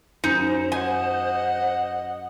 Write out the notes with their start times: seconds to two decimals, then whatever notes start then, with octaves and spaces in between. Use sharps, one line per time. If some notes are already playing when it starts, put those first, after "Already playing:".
0.24 F#2 D#4 C5
0.72 D#5 F#5 G#5